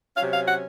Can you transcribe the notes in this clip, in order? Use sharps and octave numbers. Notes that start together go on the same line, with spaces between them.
C3 F#3 C#4 F5
F5
F#5